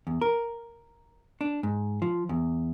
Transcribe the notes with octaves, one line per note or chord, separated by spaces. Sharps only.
E2
A#4
D4
G#2
F3
E2